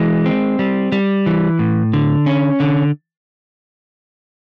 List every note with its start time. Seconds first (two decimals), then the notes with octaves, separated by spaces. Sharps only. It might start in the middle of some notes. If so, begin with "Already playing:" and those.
Already playing: E3 G#3
0.26 C4
0.59 G3
0.92 G3
1.26 E3
1.59 A2
1.93 D3
2.26 C#4
2.60 D3